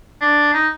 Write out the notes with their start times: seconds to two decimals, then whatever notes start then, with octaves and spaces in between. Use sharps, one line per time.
0.21 D4
0.53 D#4